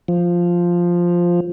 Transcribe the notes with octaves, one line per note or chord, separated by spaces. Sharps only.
F3